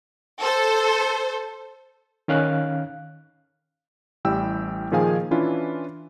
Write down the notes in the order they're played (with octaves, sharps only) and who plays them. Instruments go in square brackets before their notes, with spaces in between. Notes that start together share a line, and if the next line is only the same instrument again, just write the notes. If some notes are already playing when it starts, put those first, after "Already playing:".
[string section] A4 C5
[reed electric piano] D#3 C#4 F5 F#6
[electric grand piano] A1 G3 E4 G5 E6
A#2 D#3 F3 G#4 F5 G#5
E3 C#4 D4 E4 F4 B4